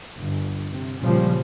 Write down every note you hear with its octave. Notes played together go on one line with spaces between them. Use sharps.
G1
C3
A#2 C#3 F3 G3